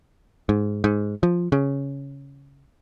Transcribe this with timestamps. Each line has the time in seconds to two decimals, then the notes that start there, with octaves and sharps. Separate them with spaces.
0.49 G#2
0.84 G#2
1.23 F3
1.52 C#3